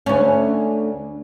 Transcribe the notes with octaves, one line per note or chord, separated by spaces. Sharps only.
D2 C#4